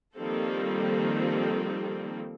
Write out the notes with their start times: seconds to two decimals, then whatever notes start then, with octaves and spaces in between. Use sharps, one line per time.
0.15 D#3 F3 G3 A#3 C4 A4